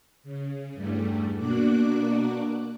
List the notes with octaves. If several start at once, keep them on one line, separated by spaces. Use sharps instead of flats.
C#3
E2 G2 G3 A3
B2 A#3 D4 F#4 D6 F#6